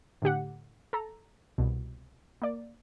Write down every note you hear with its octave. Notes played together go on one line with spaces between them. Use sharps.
A2 D3 G4 F#5
A4 A#5
C2 B2
A#3 D5